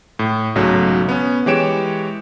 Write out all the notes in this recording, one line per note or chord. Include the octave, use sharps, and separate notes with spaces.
A2
B1 G#2 C#3 F#3 A3
B3 C#4
E3 G#3 G4 C#5 D7 E7